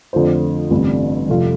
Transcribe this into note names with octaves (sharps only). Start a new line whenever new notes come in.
F2 D3 A3 F4 C5
A1 G2 D3 G3 C4
F1 F2 C3 A3 F4